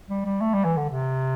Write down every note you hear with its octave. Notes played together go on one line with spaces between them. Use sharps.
G3
G3
A3
G3
E3
D3
C3